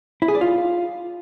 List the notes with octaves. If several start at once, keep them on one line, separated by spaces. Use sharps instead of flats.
E4
G#4
D5
F4